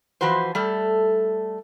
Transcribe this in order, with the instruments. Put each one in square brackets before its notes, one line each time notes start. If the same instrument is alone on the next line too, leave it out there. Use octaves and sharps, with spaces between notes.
[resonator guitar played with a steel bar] E3 F3 F#4 B4 C5
G3 A3 A4